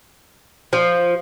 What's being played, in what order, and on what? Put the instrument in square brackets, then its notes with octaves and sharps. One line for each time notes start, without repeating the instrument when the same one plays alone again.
[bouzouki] F3